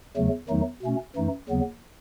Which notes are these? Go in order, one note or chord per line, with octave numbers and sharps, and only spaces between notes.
E2 C#3 F#3 A3
E2 D#3 F#3 A3 D#4
B2 A3 C#4
F#2 E3 A3 D#4
D#2 C#3 F#3 B3